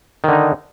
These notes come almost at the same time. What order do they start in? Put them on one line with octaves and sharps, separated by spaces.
D#3 D3 D#4